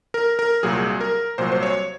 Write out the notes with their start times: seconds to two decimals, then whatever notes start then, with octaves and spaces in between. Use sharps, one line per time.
0.14 A#4
0.39 A#4
0.63 C2 A#2 F#3 G#4
1.01 A#4
1.38 C2 A#2 F#3 C5
1.52 C5
1.63 C#5